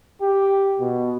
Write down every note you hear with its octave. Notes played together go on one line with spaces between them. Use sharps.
G4
B2